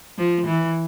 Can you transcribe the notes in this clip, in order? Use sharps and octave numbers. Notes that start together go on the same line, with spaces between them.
F3
E3